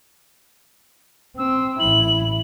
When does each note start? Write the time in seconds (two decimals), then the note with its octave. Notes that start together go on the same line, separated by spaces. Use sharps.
1.38 C4 E6
1.80 A1 E4 F#7